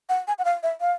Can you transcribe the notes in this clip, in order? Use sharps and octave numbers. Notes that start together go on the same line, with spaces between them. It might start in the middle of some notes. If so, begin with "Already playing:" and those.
F#5
G#5
F#5
F5
E5
F5